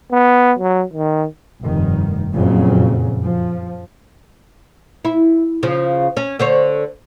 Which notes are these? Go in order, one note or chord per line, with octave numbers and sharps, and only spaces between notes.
B3
F#3
D#3
F1 G2 D#3
F#1 F2 A#2 C#3 F#3
F3
E4
C#3 F3
C#4
D3 C5 C#5